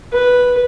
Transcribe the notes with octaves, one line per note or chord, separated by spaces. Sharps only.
B4